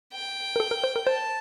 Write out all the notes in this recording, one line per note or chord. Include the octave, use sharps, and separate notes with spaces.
G5
A#4
A4
A#4
C5
A#4
C5 A5